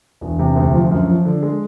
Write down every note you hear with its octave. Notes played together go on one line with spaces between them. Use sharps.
E1
C3
D2
F3
F#2
F3
D3
G#3